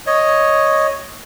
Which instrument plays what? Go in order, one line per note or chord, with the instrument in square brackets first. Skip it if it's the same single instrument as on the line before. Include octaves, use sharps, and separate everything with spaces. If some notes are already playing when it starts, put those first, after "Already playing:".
[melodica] C#5 D#5